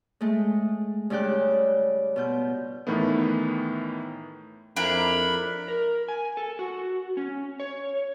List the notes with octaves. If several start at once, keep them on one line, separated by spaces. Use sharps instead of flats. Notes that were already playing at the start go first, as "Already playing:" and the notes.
G#3 A3
G2 C#3 D5 G5 F#6
B2 F4 G6
A2 D#3 E3 A3 B3
F2 D4 E4 A#4 B5
A#4
G#5
A4
F#4
C#4
C#5